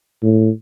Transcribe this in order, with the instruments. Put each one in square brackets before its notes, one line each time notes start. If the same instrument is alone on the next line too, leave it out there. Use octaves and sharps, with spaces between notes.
[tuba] A2